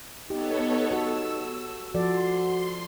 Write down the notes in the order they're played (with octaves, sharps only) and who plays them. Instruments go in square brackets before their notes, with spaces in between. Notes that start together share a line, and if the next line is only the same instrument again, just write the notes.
[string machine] B3 A4 C#5 [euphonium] D#4 [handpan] G4
[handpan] F#4 A4 [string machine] E6
[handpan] F3 A4 D5 [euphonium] F#4 [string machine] C6